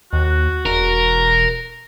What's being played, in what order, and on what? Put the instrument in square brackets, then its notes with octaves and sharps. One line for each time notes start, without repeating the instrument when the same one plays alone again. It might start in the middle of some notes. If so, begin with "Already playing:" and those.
[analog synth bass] D#2 [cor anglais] F#4
[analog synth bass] E1 [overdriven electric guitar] A#4